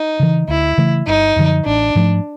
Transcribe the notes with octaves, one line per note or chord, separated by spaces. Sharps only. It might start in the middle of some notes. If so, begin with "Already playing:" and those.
Already playing: D#4
C#3 E3
D2 E4
C#3 E3 A3
G1 D#4
F#2 D3 F3
A1 D4
G#2 F3 A3